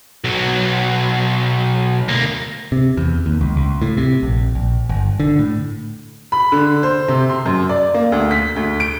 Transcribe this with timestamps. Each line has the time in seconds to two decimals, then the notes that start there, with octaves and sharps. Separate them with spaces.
0.24 B1 F#3
2.08 D2 A#3
2.72 C3
2.97 E2
3.26 D#2
3.41 C#2
3.56 C#2
3.82 A2
3.97 C3
4.23 A#1
4.55 A#1
4.89 G1
5.20 D3
5.39 A2
6.32 B5
6.52 D3
6.83 C5
7.08 C3
7.29 C6
7.46 F#2
7.69 D5
7.94 A#3
8.12 D2
8.31 B6
8.56 D2
8.80 D7